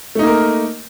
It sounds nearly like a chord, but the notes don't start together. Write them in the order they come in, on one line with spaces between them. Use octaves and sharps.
A3 D#4 A#3 A#4